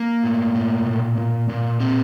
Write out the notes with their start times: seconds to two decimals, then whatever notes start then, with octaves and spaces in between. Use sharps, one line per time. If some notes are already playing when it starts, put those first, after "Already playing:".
Already playing: A#3
0.23 A2
0.55 A2
0.86 A#2
1.18 A#2
1.49 A#2
1.80 A#2 C4